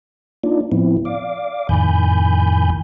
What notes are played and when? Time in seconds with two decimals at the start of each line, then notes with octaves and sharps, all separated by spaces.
0.44 A#3 D4 D#4 F4 D5
0.72 A2 F3 B3 C4 E4
1.05 D5 F5 D6
1.69 F2 A2 D#3 G#5 B5 G6